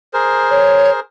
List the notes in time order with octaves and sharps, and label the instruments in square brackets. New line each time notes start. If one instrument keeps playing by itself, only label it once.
[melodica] G#4 A#4 C5
[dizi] C#5